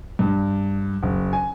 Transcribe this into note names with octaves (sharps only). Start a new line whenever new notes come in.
G2
F#1
G#5